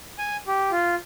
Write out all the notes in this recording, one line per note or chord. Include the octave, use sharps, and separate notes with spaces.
G#5
G4
F4